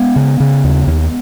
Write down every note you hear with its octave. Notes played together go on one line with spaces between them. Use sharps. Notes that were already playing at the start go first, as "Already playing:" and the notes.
Already playing: G#3 B3
C#3
C#3
D#2
D#2